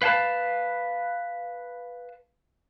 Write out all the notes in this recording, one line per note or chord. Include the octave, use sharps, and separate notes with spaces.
B4 F5 G5 A5